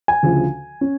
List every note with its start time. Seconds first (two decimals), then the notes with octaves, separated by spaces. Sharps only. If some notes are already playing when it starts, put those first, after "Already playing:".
0.08 G#5
0.22 D2 C#3 F3
0.81 C#4